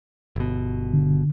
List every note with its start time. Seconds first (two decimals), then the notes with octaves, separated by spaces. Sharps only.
0.36 G1 B2
0.93 D3